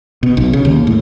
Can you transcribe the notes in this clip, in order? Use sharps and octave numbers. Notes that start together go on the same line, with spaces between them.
B2
B1
C#3
D#2
A2